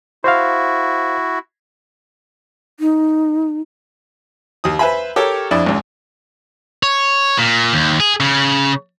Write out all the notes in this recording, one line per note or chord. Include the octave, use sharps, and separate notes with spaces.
E4 F#4 C5 F5
D#4
D#2 D#6
B4 C5 E5 G#5 B5
G4 A4 A#4 C#5
F2 D4 E4 D5
G#1 C#2
C#5
A#2
D#2
G#4
C#3